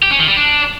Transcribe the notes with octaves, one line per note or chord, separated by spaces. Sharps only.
G4
C#4
D#3
G3
D4